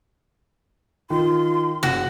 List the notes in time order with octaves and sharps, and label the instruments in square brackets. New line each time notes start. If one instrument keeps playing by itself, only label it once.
[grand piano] D#3 [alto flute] F4 [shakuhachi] C6
[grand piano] F#1 [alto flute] C#4 [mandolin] F#4